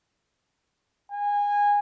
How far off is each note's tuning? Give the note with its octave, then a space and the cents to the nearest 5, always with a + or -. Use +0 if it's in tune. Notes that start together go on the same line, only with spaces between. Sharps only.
G#5 -20